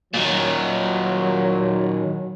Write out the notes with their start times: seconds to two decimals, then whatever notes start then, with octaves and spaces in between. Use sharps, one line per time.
0.14 A#2 D#3 F#3